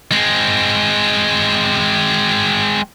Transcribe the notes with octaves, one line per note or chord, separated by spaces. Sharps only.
G#3 C4